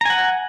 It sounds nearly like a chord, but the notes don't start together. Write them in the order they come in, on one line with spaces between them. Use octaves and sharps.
A#5 G#5 F#5